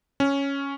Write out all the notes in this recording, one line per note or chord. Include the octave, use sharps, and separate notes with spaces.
C#4